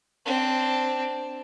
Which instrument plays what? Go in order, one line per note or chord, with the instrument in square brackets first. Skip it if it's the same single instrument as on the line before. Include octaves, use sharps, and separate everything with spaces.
[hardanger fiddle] C4 D4